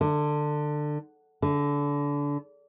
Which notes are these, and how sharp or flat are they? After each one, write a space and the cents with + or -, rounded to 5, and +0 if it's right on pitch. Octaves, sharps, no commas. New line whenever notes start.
D3 +20
D3 -25